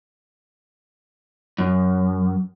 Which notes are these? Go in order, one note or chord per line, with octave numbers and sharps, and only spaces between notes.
F#2